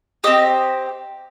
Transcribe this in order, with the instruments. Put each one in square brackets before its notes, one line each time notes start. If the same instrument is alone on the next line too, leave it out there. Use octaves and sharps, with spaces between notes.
[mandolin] C4 G4 D#5